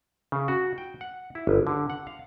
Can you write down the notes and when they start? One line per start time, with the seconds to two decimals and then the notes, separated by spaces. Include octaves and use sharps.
0.32 C#3
0.48 F#4
0.78 G5
1.01 F#5
1.35 E4
1.47 G1
1.67 D3
1.90 F#5
2.07 F5